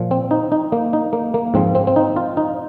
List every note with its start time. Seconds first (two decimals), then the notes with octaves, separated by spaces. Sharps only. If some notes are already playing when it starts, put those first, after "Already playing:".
Already playing: A#2 F3
0.11 C4
0.31 D#4
0.52 D#4
0.72 A#3
0.93 D#4
1.13 A#3
1.34 A#3
1.54 G#2 F3 C4
1.75 C4
1.87 C4
1.96 D#4
2.16 F4
2.37 D#4